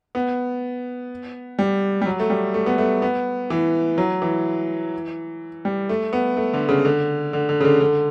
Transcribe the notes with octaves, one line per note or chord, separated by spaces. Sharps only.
B3
G3
G3
F#3
A3
G3
A3
B3
A3
B3
E3
F#3
E3
G3
A3
B3
A3
D3
C#3
D3
D3
D3
C#3
D3
D3